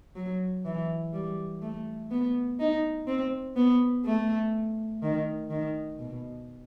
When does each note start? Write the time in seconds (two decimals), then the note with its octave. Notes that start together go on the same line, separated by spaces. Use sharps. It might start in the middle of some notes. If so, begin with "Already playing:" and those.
0.15 F#3
0.65 E3
1.13 G3
1.62 A3
2.11 B3
2.59 D#4
3.07 C4
3.56 B3
4.05 A3
5.02 D#3
5.50 D#3
5.99 B2